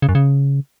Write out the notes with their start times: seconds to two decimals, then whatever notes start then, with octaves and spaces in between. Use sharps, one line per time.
0.02 C#3
0.09 F#2
0.15 C#3